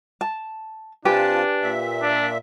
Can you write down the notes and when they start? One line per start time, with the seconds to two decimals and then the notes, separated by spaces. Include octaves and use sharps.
0.21 A5
1.05 C3 D4 F4 G4 B4 G#5 A5
1.62 A#2 E5
2.02 D4